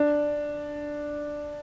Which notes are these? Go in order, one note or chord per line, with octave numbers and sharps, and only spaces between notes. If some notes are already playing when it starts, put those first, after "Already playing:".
Already playing: D4